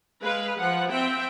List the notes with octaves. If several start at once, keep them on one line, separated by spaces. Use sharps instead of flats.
G#3 B4 F5
F3 F#5
C4 E5 G5